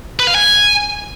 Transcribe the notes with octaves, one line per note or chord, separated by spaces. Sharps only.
B4
F5
G#5